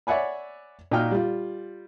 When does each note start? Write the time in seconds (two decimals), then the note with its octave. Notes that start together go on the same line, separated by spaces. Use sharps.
0.07 C#5 D5 E5 F#5 G#5 B5
0.91 A#2 D#4 F#4 G5 F6
1.11 G3 F4